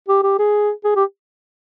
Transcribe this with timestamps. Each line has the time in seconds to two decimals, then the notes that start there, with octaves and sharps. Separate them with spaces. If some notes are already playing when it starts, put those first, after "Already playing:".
0.08 G4
0.23 G4
0.39 G#4
0.84 G#4
0.96 G4